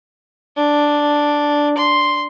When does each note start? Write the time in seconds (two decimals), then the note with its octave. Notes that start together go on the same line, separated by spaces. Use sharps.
0.57 D4
1.77 C6